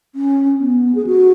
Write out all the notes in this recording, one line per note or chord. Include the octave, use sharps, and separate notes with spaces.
C#4
B3
G#4
F#4